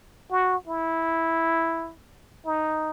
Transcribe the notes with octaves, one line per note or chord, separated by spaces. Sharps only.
F#4
E4
D#4